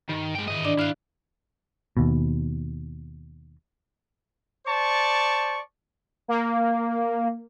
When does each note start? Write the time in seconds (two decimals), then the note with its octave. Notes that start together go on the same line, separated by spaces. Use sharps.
0.09 G2 D#3
0.35 G#3 G5
0.48 G#2 D#3 E3 D#5
0.65 D4 D5
0.79 E4 F5 F6 F#6
1.97 D#2 B2
4.67 C5 D5 A5 C#6
6.28 A#3